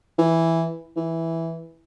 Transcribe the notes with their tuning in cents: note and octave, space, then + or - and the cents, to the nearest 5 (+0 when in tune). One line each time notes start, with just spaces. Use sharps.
E3 +0
E3 -5